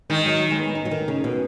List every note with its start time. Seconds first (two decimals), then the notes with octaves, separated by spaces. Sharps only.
0.10 D#3 G#3
0.26 F#3
0.51 G#3
0.59 B3
0.75 D#4
0.85 F#3
0.91 D#3
1.08 C#3
1.24 B2